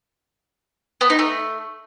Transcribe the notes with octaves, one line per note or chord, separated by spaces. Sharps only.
B3
D#4
A3